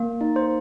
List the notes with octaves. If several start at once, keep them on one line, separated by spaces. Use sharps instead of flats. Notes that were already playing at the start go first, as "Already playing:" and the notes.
Already playing: A#3
D#4
C5